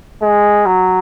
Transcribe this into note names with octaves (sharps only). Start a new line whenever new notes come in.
G#3
F#3